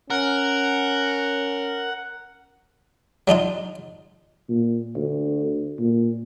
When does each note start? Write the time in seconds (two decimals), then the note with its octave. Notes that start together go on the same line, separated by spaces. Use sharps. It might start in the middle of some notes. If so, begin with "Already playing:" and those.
0.10 C#4 A#4 F#5
3.28 F#3 D4 D#4 F4
4.49 A#2
4.96 D2
5.79 A#2